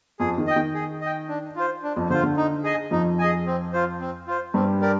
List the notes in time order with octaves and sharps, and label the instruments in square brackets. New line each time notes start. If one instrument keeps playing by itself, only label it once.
[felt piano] F2 F3 [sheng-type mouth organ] G#4
[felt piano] D#3
[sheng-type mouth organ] D#5 G5
[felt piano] D#3
[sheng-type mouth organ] G#4
D#5 G5
D4
F4 C5
D4
[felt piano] F2 F3
[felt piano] D3 [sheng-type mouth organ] F4 C5
[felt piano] D3
[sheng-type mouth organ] D#4
G#4 D#5 G#5
[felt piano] F2 F3 [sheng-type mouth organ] D#4
[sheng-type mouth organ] G#4 D#5 G#5
C4
F4 C5
C4
F4 C5
[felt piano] G2 G3 [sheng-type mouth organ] C4
[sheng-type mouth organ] G4 A#4 D5